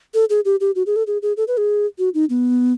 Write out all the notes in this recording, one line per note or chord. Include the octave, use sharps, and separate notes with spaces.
A4
G#4
G4
G4
F#4
G#4
A4
G#4
G#4
A4
B4
G#4
F#4
D#4
B3